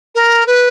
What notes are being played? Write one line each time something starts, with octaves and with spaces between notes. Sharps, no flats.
A#4
B4